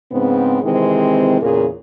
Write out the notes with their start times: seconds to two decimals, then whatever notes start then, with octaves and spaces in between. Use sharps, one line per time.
0.11 G#2 C#3 B3 C4
0.62 C3 D#3 E3 G#3 C4
1.41 E2 A#2 C#3 G#4 A#4